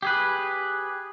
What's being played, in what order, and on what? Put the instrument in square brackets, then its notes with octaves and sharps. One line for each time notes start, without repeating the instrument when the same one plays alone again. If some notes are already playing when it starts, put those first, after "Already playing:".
[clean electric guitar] G4 G#4 B4